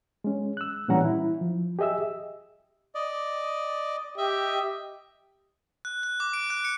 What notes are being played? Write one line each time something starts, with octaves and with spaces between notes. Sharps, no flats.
G#3 C#4
E6 F#6
A#2 E3 G3 C#4 F#5 A#5
E4
F3
G4 G#4 D#5 E5 E6
D5 D#5
G4 D#5 E5
F#6
F#6
D6
D7
F#6
C#7